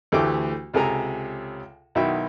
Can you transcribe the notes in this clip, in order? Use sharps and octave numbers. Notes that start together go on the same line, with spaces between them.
D2 E3 A3 G4 G5 D6
C#2 C3 G#4 A4 G#5 A#5
B1 D#3 E4 F#4 E5 G5